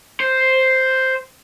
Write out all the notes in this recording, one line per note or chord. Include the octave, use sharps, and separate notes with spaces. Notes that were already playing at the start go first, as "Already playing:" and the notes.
C5